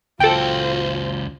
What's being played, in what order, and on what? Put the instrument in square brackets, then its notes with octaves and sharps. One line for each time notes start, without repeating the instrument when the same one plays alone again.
[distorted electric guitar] C#2 F#4 [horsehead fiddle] F4 C5 [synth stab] A4 G5